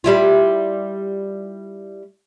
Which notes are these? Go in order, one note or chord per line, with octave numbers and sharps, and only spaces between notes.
G3 E4 F4